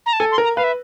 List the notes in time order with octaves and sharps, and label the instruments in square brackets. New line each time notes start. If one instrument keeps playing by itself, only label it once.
[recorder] A#5
A5
[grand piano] A4 [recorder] G#5
[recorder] C6
[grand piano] A#4
[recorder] A#5
[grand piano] B4 [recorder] F5
[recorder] E5